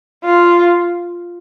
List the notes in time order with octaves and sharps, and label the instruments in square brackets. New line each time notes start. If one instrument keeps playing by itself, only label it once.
[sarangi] F4